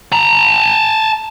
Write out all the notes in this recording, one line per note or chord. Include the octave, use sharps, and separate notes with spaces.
A5 A#5